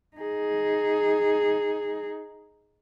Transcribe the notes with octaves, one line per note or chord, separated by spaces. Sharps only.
D#4 G#4